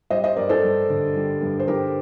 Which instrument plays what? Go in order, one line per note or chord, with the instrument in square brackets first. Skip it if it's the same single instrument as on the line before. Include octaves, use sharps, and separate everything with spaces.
[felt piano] G3 C5 D#5
C5 D#5
G2 A#4 D5
A4 C5
G2
D3
G3
G2
C5
G2 G4 A#4